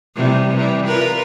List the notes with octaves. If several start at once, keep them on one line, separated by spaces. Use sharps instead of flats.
C3 E3 G3
E3 G3
F4 A#4 B4